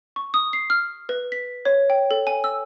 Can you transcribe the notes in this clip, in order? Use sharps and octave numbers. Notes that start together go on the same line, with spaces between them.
C#6
D#6
C7
F6
B4
B6
C#5
G5
A4
G#5
E6